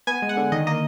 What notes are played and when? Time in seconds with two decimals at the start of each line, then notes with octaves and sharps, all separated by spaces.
0.07 B3 G#5
0.22 G#3
0.29 F#5
0.37 D3
0.52 D#3 D#5
0.67 A#3 D#5